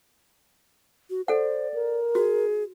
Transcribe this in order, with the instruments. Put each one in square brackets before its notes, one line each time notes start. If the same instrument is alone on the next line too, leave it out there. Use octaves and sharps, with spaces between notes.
[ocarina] F#4
[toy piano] A4 F#5 [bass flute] C5 [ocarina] D5
[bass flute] A#4
[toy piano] F#4 [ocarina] G#4